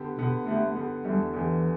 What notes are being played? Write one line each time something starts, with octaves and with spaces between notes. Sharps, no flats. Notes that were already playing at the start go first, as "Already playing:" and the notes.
Already playing: D3 B3 G4
B2 D3 B3 G4
D3 A3 B3 G4
D3 B3 G4
E2 D3 G3 A3 G4
E2 D3 E3 A3 G4